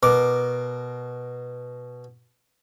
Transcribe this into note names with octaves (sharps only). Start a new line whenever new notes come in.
B2 A#4 D6